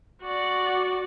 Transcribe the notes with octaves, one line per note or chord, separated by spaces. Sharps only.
F#4 D5